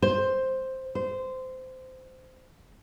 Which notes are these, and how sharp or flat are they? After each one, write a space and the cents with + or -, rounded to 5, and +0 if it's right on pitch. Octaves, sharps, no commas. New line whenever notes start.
C5 +5
C5 -20